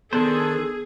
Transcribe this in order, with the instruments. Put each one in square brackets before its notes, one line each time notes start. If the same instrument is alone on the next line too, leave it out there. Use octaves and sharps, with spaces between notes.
[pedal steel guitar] D#3 D4 C5 [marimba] B3 [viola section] G#4 [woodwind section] A4